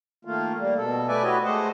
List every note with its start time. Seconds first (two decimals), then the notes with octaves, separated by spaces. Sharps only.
0.25 D#3 A3 A#3 F4
0.58 G3 A#3
0.77 B2 A4
1.08 A3 B4 D5 E5 G#5
1.23 E4 F#4 G4 B4 C#5 D#5
1.44 G#3 A3 C5 D#5 F#5